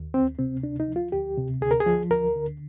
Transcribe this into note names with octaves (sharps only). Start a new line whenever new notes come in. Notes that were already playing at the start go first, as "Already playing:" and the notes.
Already playing: D#2
D2 C4
C3 C4
D2 D4
D#4
F3
F4
D2 G4
C3
D2 G#4
A#4
G#4
F3
D2 A#4
D3